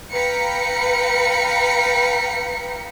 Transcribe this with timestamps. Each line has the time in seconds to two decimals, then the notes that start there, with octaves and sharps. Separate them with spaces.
0.12 B4 F5 G5 A#5 B6 C#7